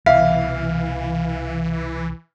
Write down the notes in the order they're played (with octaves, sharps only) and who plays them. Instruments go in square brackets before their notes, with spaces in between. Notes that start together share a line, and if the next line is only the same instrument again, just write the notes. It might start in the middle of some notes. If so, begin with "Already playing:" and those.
[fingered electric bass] C2 B2 [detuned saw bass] E3 [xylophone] E5 [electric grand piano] F5